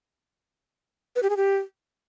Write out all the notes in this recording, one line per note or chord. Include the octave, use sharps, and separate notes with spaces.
B4
G4
G#4
G4